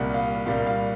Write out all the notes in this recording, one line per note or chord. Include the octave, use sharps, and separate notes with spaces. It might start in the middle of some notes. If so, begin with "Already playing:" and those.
Already playing: C2 A#2 G3 A#3 F#5
F5
C2 A#2 G3 A#3 F5
F5